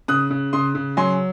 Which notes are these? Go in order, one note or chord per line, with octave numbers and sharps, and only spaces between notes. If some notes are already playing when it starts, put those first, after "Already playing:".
C#3 D#6 F#6
C#3
C#3 C6 D#6
C#3
F#3 G#5 C6